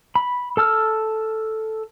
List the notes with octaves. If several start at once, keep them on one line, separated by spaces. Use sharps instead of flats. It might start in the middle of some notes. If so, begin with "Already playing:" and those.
B5
A4 A5 E6 F6